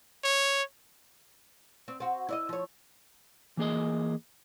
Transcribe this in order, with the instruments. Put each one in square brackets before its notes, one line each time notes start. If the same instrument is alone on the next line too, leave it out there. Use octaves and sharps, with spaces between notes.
[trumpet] C#5
[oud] C4
C4 F#4
E4 D5 D#5
F3 C#5
[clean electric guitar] E3 A#3 G#4 D#5